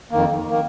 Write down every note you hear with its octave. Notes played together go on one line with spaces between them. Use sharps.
F2 D#3 A#3
D#3 A#3